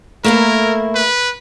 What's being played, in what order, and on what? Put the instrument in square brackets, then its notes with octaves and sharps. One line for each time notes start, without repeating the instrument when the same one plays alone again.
[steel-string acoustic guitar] A3 A#3 E4 [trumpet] A#4
[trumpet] B4